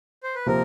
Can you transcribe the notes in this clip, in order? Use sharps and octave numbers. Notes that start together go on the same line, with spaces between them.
C5
B4
C3 F3 A#3 A#4